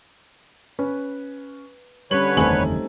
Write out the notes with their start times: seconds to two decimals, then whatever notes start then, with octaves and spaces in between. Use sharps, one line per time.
0.79 C#4 B4
2.11 D3 G3 C#4 B4 C#5 F#7
2.37 F#1 E2 D#3 A3 C4 D#4 G#5 F#7